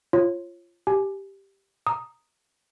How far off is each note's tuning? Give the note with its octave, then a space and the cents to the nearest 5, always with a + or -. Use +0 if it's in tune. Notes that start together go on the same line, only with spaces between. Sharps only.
F4 -15 C#5 -30
G4 +0 G#5 +20
A#5 +0 D#6 +0